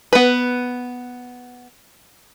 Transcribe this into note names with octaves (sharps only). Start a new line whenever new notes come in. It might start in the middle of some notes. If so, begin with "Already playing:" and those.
B3 B4